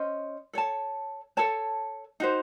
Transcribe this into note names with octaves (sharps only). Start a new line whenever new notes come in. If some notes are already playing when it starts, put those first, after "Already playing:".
Already playing: C#4 C5 D#5
A4 C#5 A5
A4 C#5 A5
D#4 F#4 C5